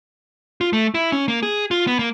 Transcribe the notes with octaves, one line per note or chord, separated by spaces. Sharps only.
F4
A3
E4
C#4
A#3
G#4
F4
B3
A#3